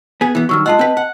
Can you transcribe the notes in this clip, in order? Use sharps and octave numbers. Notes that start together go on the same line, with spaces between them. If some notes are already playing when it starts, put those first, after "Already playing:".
B3 G#4
E3 B3
G2 D#3 F#3 C#6 E6 F6
G#3 F4 D#5 F#5 A5
C4 B4
F#5